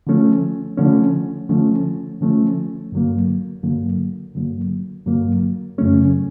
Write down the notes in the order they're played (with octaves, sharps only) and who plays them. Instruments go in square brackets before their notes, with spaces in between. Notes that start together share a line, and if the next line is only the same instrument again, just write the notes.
[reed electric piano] D3 F3 A3 C#4
D3 F3 A3 C#4
D3 F3 A3 C#4
D3 F3 A3 C#4
G2 D3 F#3 A#3
G2 D3 F#3 A#3
G2 D3 F#3 A#3
G2 D3 F#3 A#3
F#2 C#3 F#3 A3 C#4